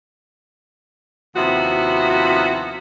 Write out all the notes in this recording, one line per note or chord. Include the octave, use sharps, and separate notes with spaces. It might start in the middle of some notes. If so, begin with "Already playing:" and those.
D#2 C3 F3 B3 E4 F#4